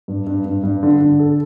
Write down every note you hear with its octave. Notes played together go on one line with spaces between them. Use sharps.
G2
G2
G2
G2
D3
D3
A4